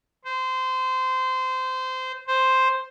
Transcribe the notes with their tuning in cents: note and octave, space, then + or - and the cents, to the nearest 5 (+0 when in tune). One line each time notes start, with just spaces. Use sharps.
C5 -20
C5 +0